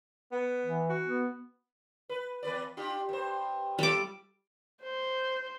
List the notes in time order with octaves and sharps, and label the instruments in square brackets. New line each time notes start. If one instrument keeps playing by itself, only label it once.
[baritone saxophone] B3
[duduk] E3
[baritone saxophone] F#4
[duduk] B3
[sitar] B4
E2 B4 D5
D4 F4 G4
G2 C5
[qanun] G3 D6 [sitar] E4 F4 A4
[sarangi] C5